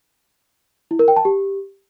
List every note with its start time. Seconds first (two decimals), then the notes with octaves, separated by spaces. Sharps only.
0.91 E4
0.99 A#4
1.08 G5
1.17 A5
1.25 G4